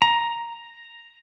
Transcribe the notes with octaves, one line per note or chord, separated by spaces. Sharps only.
A#5